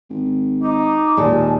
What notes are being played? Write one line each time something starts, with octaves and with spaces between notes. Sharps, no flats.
G#1
D#4 D6
D#2 A#2 G#3 A5